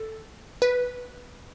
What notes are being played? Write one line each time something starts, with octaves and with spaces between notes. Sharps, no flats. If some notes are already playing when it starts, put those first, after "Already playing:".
Already playing: A4
B4